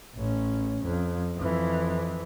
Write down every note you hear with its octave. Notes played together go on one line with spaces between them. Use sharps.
A1 C#4
F2
F2 E3